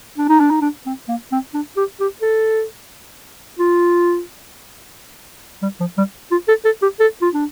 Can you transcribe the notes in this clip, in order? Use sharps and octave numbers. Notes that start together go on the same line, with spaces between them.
D4
D#4
D4
D#4
D4
C4
A#3
C4
D4
G4
G4
A4
F4
G3
F3
G3
F4
A4
A4
G4
A4
F4
D4